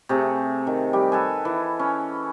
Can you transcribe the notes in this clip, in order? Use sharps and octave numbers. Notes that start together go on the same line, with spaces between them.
C3 A3 G#4
D#3
G3 G4
A4 B4 G#5
E3
C#4